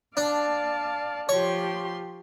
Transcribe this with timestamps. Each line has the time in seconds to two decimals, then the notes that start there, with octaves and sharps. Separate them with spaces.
0.17 D4 D5 F5 A5
1.29 F3 G4 C#5 C6